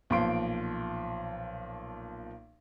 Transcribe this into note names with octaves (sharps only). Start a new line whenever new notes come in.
B1 A#2 F3 C6 D7